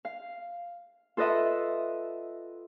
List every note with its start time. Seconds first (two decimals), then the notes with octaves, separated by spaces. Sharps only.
0.05 F5
1.17 F4 A4 B4 D#5 E5 F#5